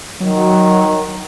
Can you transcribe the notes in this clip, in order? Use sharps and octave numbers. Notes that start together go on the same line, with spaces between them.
D#3 F#3